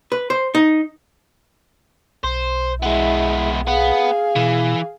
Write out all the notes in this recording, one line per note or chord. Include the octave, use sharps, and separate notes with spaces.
B4
C5
D#4
B1 C5
G#3 B3 E4
B3 G#4 F5
B2 E3